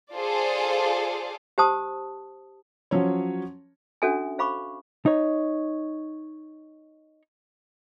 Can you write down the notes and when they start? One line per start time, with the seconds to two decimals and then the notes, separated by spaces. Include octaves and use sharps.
0.13 F4 G#4 A4 C5 D5 F5
1.58 G4 C5 A5 D#6
2.91 F3 F#3 C#4 C#5
4.02 C#4 D4 F#4 A4 E5 G#5
4.39 C5 F5 B5 C#6 D6
5.06 D#4 C#5